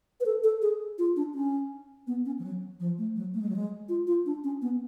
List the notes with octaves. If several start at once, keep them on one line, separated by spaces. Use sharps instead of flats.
B4
A4
A4
G#4
F4
D4
C#4
B3
C#4
F3
F#3
F3
A3
F#3
A3
G#3
F#3
G#3
F4
F4
D4
C#4
B3